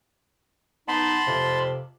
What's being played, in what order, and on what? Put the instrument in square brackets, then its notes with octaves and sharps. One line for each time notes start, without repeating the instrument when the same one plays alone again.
[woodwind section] B3 D#4 [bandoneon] A5 B5 C6
[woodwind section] F2 C3